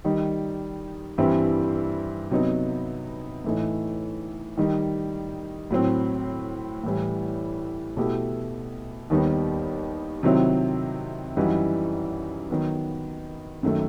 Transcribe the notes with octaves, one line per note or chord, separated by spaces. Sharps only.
D#3 G3 D#4
G2 E3 G3 C4 E4
C3 F#3 B3 D#4
A2 E3 A3 D#4
D#3 G3 D#4
A2 F#3 C4
A2 E3 G3
B2 A3 E4 G4
D#2 D#3 G3 B3 D#4
C3 D#3 F#3 C4 E4
F#2 E3 G3 D#4 F#4
D#3 F#3 B3
F#2 D#3 A3